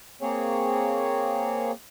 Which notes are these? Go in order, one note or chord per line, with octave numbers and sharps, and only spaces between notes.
A#3 C4 G#4 C#5